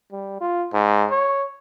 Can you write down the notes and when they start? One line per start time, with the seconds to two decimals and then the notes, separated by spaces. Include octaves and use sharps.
0.12 G3
0.41 F4
0.73 G#2
1.11 C#5